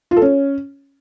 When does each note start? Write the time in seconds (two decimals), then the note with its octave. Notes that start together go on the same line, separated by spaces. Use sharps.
0.11 F4
0.16 A4
0.22 C#4